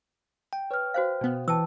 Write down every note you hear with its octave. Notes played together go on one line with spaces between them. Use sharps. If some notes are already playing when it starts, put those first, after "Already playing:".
G5
B4 C#5 F6
F#4 C5 F5
B2 B3
E3 B4 G5 A5 E6